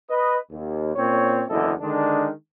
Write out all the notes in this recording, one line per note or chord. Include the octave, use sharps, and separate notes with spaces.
B4 D#5
D#2
A#2 C4 C#4 C#5
F#1 E2 D3 E4 A4 D#5
D3 D#3 G#3 D4